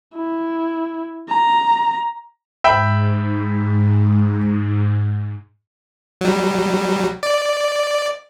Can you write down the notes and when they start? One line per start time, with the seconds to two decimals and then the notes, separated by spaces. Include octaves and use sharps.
0.14 E4
1.28 A#5
2.64 G#2 E5 G5 B5
6.21 F#3 G3
7.23 D5